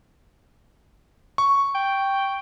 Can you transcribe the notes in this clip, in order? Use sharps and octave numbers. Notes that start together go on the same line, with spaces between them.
C#6
G5